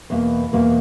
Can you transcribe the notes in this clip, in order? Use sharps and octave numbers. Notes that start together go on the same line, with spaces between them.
E2 B2 A#3
E2 B2 A#3